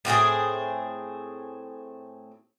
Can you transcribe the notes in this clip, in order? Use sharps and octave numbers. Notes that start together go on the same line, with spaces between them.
A2 C4 G4 G#4